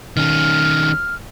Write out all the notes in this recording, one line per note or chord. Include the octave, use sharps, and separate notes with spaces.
D#3 C#4 F6